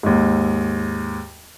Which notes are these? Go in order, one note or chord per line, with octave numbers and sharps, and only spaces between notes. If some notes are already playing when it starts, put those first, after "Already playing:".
D#2 G#2